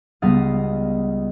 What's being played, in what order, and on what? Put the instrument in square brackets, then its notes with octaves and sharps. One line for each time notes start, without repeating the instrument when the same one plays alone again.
[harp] C#2 G3 B3 D#5 F5 A6